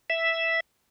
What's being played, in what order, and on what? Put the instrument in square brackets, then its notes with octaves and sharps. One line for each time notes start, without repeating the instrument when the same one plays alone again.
[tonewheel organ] E5